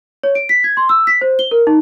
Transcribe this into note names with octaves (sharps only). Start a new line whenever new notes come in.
C#5
D7
B6
G#6
C6
E6
B6
C5
G7
A#4
D#4